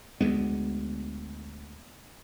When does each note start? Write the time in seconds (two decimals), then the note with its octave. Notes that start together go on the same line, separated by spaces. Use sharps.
0.21 D2 G#3 B3